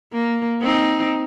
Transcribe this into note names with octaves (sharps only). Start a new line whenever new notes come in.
A#3
C4 D#4